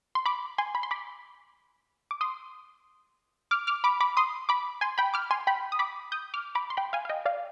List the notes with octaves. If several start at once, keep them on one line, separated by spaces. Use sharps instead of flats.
C6
B5 D6
G#5 C6
B5
C6
B5 D6
D6
C6 D#6
D6 F6
D6 F6
B5 D6
B5 D6
C6 D#6
B5 D6
G#5 C6
G5 B5
D6 F6
G#5 C6
G5 B5
D#6
B5 D6
D#6 G6
D6 F6
B5 D6
C6
G5 B5
F5 G#5
F5
D#5 G5
D5 F5